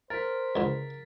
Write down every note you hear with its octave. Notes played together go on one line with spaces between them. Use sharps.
A#4 C5 A6 B6
C#2 D3